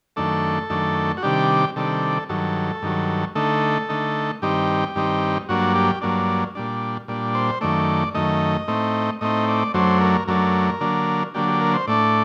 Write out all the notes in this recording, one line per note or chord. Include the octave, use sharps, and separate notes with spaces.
F#2 D#3 A3 D4 A4
F#2 D#3 A3 D4
F#4
C3 D#3 G3 D4 G4
C3 D#3 G3 D4 A4
G2 D#3 F#3 A4
G2 D#3 F#3
D3 A3 D#4 A4
D3 A3 D#4
G2 D#3 G3 C4 D#4 G4
G2 D#3 G3 C4 D#4
G2 F#3 A#3 D4 F#4
G4
G2 F#3 A#3 D4
A#2 G3 D4
A#2 G3 D4
C5
F#2 D#3 A3 D5
F#2 D#3 A3 D#5
A2 A3 C4 D#4
A2 A3 C4 D#4 D#5
D5
F#2 F#3 A3 D4 C5
A#4
F#2 F#3 A3 D4 A#4
D3 F#3 A#3 D4
D3 F#3 A#3 D4 G4
G4
A#4
C5
A2 A3 D4 D5